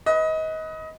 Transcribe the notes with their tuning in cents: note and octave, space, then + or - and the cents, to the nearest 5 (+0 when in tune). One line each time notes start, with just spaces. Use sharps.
B4 +0 D#5 +25